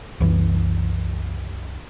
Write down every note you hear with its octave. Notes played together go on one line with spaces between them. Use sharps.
C2 F#2 E3